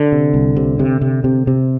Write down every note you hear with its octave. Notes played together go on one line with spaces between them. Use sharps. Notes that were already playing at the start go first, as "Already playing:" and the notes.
Already playing: D3
C3
C2
C3
C3
C3
C3
C3